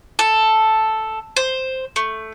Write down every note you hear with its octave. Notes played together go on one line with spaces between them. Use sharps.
A4
C5
A3